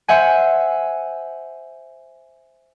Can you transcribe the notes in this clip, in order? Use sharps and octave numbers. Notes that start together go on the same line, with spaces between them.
C5 E5 F#5 G#5